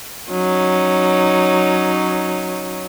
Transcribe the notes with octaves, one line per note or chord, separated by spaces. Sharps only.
F#3 C#4 D#4